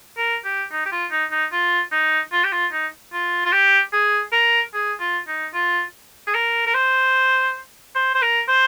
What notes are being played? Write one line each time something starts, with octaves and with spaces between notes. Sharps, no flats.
A#4
G4
D#4
G4
F4
D#4
D#4
F4
D#4
F4
G4
F4
D#4
F4
F4
G4
G#4
A#4
G#4
F4
D#4
F4
G#4
A#4
A#4
C5
C5
C5
A#4
C5